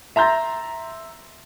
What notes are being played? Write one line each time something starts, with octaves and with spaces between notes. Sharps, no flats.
E5 A#5 C6 G6 A6 A#6